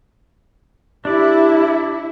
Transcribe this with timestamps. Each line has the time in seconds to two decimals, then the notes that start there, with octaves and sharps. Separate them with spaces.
1.05 D4 E4 G4 D5